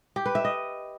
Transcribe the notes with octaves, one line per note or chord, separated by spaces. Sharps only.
G4
B4
E5
D#5